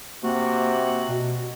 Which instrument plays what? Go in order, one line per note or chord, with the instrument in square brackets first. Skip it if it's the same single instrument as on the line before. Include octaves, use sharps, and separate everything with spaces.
[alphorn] C3 [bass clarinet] A#3 [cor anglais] F#4
[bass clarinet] B2